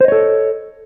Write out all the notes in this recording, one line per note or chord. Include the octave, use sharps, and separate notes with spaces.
A4 C5 C#5 D#5